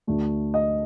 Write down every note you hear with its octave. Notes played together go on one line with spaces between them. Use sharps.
D2 D3 A3
D#5